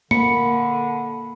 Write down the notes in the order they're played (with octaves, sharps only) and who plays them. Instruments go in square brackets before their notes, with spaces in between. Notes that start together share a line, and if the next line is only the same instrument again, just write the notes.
[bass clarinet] D3 [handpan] A#3 [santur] B5 [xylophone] C#7